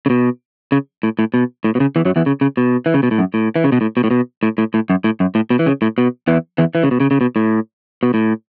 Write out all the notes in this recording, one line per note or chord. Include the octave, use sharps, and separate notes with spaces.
C#3
B2
C#3
A2
A2
B2
A2
B2
C#3
E2 E3
F#2 F#3
E2 E3
C#3
C#3
B2
E3
C#3
B2
A2
F#2
A2
E3
C#3
B2
A2
B2
A2
B2
A2
A2
A2
F#2
A2
F#2
A2
B2
E3
C#3
A2
B2
E2 E3
E2 E3
E3
C#3
B2
C#3
C#3
B2
A2
B2
A2